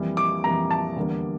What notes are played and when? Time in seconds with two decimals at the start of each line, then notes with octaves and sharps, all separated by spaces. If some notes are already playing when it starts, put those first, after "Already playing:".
Already playing: F2 E3 G3 A#3
0.17 D6
0.44 F2 E3 G3 A#3 A#5
0.71 A5
0.96 E2 D3 G3 A#3